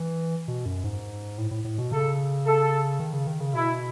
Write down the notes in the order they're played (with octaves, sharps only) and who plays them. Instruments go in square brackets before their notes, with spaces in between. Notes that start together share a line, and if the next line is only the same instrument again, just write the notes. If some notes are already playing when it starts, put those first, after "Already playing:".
Already playing: [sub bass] E3
B2
F#2
G#2
A2
A2
A2
B2
[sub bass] C#3 [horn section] A4
[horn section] A4
[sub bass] D#3
C#3
D#3
C#3
[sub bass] B2 [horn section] E4